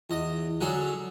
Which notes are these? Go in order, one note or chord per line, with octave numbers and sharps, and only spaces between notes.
E2 D#5 D#6
D3 F#3 C#4 G#4 A4